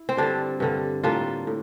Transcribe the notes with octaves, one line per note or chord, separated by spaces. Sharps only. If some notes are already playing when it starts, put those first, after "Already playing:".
Already playing: E4
C4
G2 D3 G3 D4
G2 D3 G3
A2 G3 A#3 D4 F4
A2